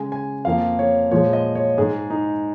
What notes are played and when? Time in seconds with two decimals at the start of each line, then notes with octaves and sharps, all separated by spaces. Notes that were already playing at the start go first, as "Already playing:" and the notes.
Already playing: C#3 G#3 G#5
0.12 G#5
0.45 F2 F3 A#3 F5
0.79 C#5
1.11 A#2 F3 G#3 C#5
1.33 D#5
1.55 C#5
1.78 G#2 G#3 G#4
2.10 D#4